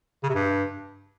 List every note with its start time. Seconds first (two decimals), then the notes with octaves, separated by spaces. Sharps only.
0.24 C#3
0.29 C3
0.35 G2